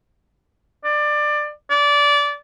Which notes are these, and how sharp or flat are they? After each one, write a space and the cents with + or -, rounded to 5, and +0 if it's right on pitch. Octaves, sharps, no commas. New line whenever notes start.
D5 +20
D5 -20